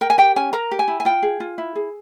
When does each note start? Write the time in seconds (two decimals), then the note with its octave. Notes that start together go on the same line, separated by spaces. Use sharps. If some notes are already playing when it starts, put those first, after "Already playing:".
0.01 A#4 G5
0.10 G#5
0.18 G4 G5
0.36 C#4 G#5
0.53 A#4 A#5
0.71 G4
0.79 G#5
0.88 E4
1.00 G#5
1.05 F4 G5
1.23 G#4
1.40 F4
1.58 E4
1.75 G#4